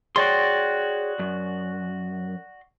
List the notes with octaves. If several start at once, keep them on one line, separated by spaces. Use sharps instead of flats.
F#4 G#4 C#5 D5 G5 C6
F#2